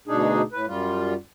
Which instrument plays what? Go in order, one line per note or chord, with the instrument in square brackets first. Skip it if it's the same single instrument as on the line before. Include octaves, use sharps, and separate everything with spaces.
[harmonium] D2 B2 D4 D#4 G#4
A2 B4
F#2 G3 F4